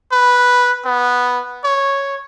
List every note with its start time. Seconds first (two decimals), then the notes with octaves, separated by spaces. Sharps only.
0.12 B4
0.85 B3
1.64 C#5